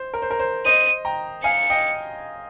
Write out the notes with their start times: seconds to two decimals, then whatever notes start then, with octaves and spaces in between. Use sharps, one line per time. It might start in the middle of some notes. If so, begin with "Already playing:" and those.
Already playing: C5
0.14 A#4
0.22 C5
0.31 A#4
0.40 C5
0.65 C5 D#5 D#7
1.05 G5 A#5
1.43 F5 G#5 C#7
1.70 D#5 G5